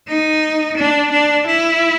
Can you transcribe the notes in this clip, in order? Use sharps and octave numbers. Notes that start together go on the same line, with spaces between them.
D#4
D4
D4
E4